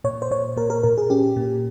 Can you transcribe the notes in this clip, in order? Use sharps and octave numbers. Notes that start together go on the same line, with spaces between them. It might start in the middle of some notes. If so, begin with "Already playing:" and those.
A#2 C#5
C5
A#2 C#5
A#2 A#4
A#4
A#2 A#4
G#4
C#4 G4
A#2